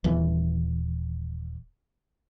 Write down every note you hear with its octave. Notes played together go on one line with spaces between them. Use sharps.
D#1 E3